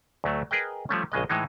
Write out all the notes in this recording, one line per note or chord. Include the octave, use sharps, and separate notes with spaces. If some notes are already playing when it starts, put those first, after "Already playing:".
D2 F#3 A3
G#4 A#4 B4 D#5 G5
F3 G3 A3 C#4
A#1 C#3 G#3 D#5
A2 E3 G#3 D#4